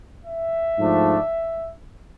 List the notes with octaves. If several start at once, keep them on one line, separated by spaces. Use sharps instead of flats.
E5
G#2 F3 A3 D4